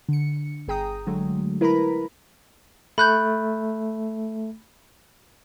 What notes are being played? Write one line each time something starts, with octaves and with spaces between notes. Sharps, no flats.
D3 C#7
G1 G#4 G5 A#5 D#6
D3 F#3 G#3 A3
E4 A#4 B4 A#5 B5
A3 B5 F#6 G6